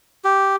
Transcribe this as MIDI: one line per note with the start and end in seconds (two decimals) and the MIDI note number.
0.25 0.56 67